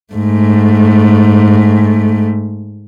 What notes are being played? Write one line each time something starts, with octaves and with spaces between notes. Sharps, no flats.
G#2 A3